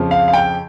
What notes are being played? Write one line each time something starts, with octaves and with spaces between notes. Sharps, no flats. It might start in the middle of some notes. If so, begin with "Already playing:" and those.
Already playing: F2 C#3 F3
F5
F5
G5